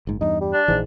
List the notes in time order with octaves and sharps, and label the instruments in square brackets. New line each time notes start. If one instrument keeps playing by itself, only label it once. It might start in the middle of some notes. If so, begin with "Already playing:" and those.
[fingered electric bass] F#1 G#2
[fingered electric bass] E2 G2 [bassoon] D#4
[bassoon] G3
[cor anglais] D4
[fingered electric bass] A#1 E3 [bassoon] G#2